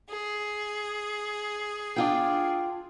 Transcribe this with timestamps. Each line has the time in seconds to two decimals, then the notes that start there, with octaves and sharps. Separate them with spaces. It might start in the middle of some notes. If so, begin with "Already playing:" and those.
0.10 G#4
1.96 D4 F4 G5